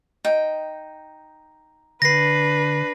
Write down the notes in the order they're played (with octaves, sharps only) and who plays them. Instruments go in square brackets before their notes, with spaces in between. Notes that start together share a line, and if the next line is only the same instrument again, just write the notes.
[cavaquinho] D#4 G5
[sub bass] D3 [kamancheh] D4 B4 [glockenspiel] A#6 C7